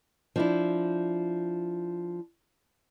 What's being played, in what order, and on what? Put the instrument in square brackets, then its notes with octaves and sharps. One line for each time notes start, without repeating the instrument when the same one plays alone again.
[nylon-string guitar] F3 D4 E4